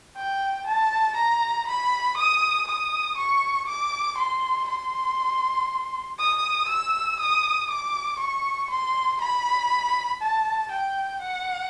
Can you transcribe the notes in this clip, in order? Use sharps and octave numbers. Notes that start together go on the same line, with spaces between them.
G5
A5
A#5
B5
D#6
D#6
C#6
D6
C6
C6
D#6
E6
D#6
D6
C#6
C6
B5
A5
G5
F#5